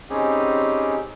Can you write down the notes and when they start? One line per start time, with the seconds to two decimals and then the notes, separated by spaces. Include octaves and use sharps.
0.10 G3 C4 C#4 D#4 G4 G#4